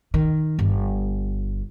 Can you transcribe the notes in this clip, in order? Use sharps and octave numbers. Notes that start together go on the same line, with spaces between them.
D#3
G1